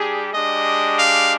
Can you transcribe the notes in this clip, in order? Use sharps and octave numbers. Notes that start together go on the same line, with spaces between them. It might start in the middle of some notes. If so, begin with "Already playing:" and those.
Already playing: G3 D4 G4 G#4
G#3 D4 G4 D#5
F5